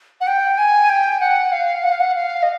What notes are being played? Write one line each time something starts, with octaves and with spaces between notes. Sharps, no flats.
F#5
G5
G#5
G5
F#5
F5
F#5
F5
F#5
F5
D#5